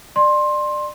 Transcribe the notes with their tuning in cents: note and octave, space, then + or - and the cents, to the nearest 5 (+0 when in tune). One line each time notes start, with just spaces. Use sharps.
D5 +25 C6 +15